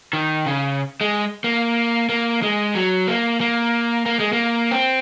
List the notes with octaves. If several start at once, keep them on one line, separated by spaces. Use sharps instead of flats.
D#3
C#3
G#3
A#3
A#3
G#3
F#3
A#3
A#3
A#3
G#3
A#3
C4